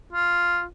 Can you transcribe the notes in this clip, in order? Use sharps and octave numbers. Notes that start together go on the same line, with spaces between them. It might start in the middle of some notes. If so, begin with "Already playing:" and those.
F4